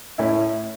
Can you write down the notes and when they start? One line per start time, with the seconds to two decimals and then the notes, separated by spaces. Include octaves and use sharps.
0.18 A2 C#4 E4